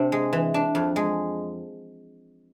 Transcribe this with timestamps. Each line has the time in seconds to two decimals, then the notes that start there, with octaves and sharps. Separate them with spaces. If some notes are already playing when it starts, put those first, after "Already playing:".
Already playing: C3 D4
0.12 G#3
0.33 E3
0.54 D4
0.75 F2
0.96 G#3